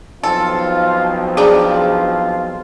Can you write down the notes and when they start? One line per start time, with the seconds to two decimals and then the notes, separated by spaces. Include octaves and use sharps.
0.23 B1 F3 C4 F4 A4
1.37 D4 F4 G4 G#4 A#5